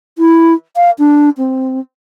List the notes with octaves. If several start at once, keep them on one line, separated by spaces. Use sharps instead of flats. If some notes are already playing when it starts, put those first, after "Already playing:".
E4
F5
D4
C4